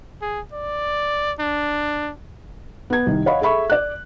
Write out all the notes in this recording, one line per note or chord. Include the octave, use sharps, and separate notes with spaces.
G#4
D5
D4
B3 G#6
C2 D#3
C#5 D#5 F5 F#5 B5
G#4 A4 E5 B5 C#6
D5 F#6